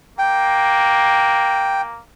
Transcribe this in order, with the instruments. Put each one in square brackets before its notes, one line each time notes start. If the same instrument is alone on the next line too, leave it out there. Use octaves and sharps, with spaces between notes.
[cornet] A#3 [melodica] G5